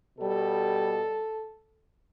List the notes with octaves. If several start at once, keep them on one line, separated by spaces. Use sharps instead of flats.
B2 G3 A4